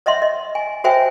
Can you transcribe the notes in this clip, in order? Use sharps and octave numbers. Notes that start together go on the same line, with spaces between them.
C#5 D#5 E5 F#5 C6
D#5
G#5
F#4 C5 C#5 E5 G5 G#5